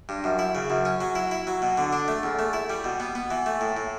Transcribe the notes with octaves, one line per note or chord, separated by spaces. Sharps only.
G2
F#2
E4
C#3
F#2
C#4
F#3
E4
E4
F#3
B2
D3
D4
A3
E2
A3
E4
G3
B2
B3
B3
E3
A3
A2
A2